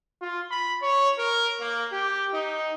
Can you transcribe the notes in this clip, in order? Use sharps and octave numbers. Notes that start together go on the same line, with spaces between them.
F4
B5
C#5
A#4
A#3
G4
D#4